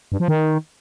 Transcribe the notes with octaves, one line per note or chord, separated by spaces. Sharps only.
G2
F3
D#3